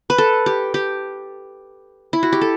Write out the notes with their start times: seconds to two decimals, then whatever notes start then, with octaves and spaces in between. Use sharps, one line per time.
0.10 B4
0.18 A4
0.46 G4
0.74 G4
2.13 E4
2.23 F#4
2.33 G4
2.41 A4